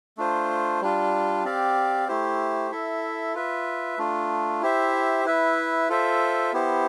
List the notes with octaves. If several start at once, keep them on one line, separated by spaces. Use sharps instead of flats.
A3 D4 F4 C5
G3 D4 F4
C4 G4 D5 F5
A3 E4 G4 C5
E4 A4 E5
F4 B4 E5
A3 D4 F4
E4 G4 C5 E5
E4 B4 E5
F4 A4 C5 E5
B3 E4 G4 C5